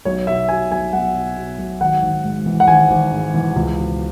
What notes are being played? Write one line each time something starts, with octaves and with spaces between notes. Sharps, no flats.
B1 C#5
B2 E5
B2 G#5
B1 G#5
B1 F#5
B2
B2
B1
G#1 F#5
G#1
G#2
E3
F#5
G#1 G#5
G#1
G#2
E3
C#2
B2